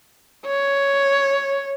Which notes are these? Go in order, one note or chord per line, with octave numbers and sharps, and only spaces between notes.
C#5